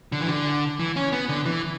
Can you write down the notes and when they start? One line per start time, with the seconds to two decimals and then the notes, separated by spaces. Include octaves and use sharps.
0.12 D3
0.21 E3
0.29 D3
0.80 E3
0.96 C#4
1.12 B3
1.29 D3
1.46 E3